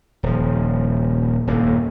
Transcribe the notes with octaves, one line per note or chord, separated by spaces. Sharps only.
D#1 F3
D#1 F#2 A2 A#3